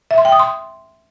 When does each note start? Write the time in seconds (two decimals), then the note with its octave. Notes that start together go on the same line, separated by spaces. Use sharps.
0.11 E5
0.18 C6
0.25 G5
0.32 D#6
0.39 C6